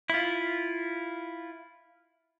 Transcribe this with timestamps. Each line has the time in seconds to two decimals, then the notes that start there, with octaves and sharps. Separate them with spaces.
0.10 E4 F4